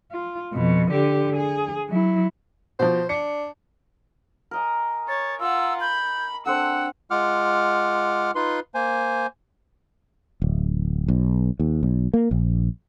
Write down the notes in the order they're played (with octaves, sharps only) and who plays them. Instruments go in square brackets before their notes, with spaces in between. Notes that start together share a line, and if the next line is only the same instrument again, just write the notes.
[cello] F4
F2 B2
D3 G4
G#4
F#3 E4
[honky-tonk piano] B2 F3 [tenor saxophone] C5
[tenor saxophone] D4 [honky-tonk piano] C#7
[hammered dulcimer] A#4 D#5 G#5
[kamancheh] C#5 [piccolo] A6
[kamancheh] F4 F#5 [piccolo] E6
[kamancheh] B5 [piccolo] G6
[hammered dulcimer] C4 D4 A4 [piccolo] F#5 [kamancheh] E6
[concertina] G#3 F4 F#5 D6 F6
D#4 F4 B4 C6
A#3 C5 G#5
[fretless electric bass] D1
B1
D#2
B1
A#3
A#1